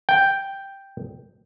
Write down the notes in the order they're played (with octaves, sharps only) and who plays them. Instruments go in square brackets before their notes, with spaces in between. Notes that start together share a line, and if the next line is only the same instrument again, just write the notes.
[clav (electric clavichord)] G5